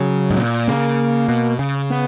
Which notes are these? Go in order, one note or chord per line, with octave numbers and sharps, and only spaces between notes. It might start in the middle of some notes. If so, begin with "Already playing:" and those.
Already playing: C#3 F#3
G#2
A#2
C#3 A#3
B2
C#3
B3